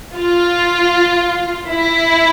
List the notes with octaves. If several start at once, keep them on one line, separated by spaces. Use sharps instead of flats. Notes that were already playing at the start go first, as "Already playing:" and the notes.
F4
E4